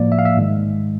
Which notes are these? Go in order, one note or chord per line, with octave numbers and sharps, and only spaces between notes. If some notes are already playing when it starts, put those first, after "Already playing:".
Already playing: A2 F3 A#3 D5
E5
F5
E5
G#2 D#3 G#3